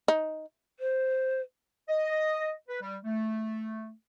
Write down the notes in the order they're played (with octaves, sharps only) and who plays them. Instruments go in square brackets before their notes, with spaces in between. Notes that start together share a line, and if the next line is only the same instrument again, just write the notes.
[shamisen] D#4
[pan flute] C5
[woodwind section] D#5
B4
G3
A3